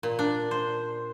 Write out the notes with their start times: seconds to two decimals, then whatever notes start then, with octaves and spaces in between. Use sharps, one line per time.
0.03 A#2
0.19 D4
0.51 C5